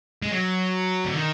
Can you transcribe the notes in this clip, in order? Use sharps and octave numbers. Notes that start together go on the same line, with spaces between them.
G#3
F#3
D3
D#3